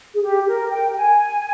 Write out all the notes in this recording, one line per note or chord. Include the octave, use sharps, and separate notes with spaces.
G#4
G4
A#4
G5
G#5